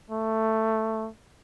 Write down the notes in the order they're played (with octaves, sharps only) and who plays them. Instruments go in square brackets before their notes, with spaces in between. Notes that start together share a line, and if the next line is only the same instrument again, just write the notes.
[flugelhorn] A3